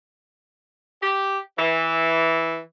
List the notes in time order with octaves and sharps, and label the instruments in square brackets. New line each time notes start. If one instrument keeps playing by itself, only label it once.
[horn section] G4
E3